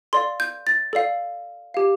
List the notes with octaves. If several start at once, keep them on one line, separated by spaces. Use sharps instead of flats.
A4 D5 F5 C6
G6
A6
A4 D5 F5
G4 F5